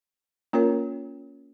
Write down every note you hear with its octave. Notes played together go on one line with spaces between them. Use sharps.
A#3 C#4 F4 A#4 C#5